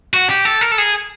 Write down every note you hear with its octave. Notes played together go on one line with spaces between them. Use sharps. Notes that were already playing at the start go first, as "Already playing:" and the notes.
F#4
G4
A4
A#4
A4
G#4